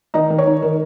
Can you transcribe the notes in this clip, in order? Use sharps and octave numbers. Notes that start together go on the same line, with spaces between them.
D#3 D#4 D#5
D#3
C#5
D#4
D#3 A#4